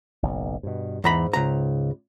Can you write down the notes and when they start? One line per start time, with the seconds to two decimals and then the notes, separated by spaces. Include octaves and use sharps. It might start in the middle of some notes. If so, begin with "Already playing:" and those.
0.23 F#1 B1
0.63 G2 B2
1.04 E2 G#2 A#5 B5
1.33 C#2 A#5